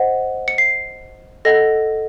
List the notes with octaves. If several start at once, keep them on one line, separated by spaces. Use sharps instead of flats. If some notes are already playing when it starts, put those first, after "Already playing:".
Already playing: C5 D#5 F#5
C#7
C7
A4 D#5 F#5 A#6